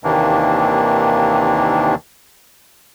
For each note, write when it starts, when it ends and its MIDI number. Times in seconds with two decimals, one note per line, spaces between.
0.04 1.95 39
0.04 1.95 48
0.04 1.95 51
0.04 1.95 52
0.04 1.95 58
0.04 1.95 62